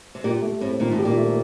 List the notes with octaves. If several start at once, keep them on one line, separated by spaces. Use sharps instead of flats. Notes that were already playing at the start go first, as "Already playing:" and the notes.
C3
A#2 G4
A3
A2 C4
A#2 D#3
A2
G4
A#2
A3